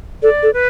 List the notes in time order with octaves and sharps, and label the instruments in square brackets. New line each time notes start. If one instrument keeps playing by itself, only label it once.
[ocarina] A4 [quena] D5
[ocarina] A4
[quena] B4